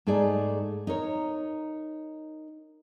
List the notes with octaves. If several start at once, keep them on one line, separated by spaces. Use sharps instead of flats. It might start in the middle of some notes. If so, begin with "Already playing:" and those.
G#2 A3 D#4 G#4 D5
D#4 A#4 C#5